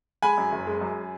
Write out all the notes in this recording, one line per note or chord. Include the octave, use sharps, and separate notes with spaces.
G#3 G#5 B5
F#2
F#1
G#3
F#2